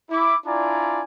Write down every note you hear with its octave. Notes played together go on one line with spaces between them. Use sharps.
E4 D6
D4 E4 F4 D5 G#5 A#5